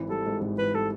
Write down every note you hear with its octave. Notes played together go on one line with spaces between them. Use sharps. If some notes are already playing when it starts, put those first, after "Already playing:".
Already playing: G#1 E3
G3 A4
G#2
G#1
E3 B4
G3 A4